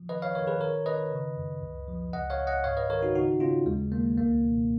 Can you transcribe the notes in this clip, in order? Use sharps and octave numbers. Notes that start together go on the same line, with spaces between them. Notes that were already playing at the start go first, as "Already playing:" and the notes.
Already playing: F3
D#3 B4 D#5
C#5 F5
D#3 A#4 C#5
G#4 B4
D#3 A#4 C#5
D#3 B4 D#5
C#3
F#2
C#2
F3
C#2 D#5 F#5
C#5 F5
C#2
D#5 F#5
G#2 C#5 F5
B4 D#5
D#3 A#4 C#5
D#4 F#4
C#3 D#4 F#4
C#3 C#4 F4
D#2 G#3
D#3 A#3
C#2 A#3
B2